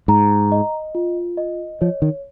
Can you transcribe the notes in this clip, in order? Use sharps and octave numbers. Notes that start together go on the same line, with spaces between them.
G#2 A#5
D#5
F4
D#5
F3 C#5
D#3